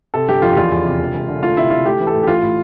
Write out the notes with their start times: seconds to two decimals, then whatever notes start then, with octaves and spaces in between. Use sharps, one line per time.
0.14 C3 A4
0.28 G1 G4
0.42 F2 F4
0.52 G4
0.57 E2 F4
0.72 E2
0.85 C3
0.99 E1
1.14 E1
1.28 D3
1.42 A3 F4
1.56 C3 E4
1.70 C3 F4
1.86 A3 G4
2.00 E3
2.07 A4
2.13 A2
2.23 G4
2.27 A1 F4
2.42 A2